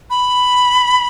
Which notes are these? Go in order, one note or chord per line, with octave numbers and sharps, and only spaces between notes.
B5